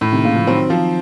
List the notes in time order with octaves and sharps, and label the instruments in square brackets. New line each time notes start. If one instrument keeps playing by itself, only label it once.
[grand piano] A2
[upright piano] C3 D#3
[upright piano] A#2 C#3 [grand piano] F4
[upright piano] C#3 F3
[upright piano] D#3 F#3 [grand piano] C4
[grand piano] F3